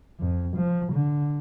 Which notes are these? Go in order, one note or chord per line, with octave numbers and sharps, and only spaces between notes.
F2
F3
D3